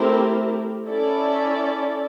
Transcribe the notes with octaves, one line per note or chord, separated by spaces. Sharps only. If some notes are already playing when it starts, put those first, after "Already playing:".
Already playing: A3 C4 E4 G4 A#4
C#4 E4 A4 D5